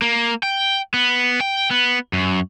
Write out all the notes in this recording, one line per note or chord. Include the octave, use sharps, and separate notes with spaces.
A#3
G5
B3
G5
B3
F#2